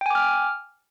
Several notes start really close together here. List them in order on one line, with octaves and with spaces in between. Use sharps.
G5 G#5 D6 F6